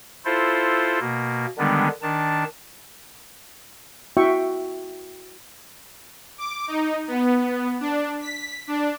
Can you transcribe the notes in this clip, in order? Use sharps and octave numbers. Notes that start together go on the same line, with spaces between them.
E4 F4 A4 C5
B2 A#3
D3 D#3 G3 G#3 B3 D4
D#3 D4 A5
E4 F#4 E5 G5 C#6
D6
D#4
B3
D4
B6
D4